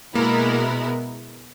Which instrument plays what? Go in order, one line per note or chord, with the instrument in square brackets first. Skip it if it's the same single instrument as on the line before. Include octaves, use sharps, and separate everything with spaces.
[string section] B2 G#3 B3 E4 A#4 [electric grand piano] A#3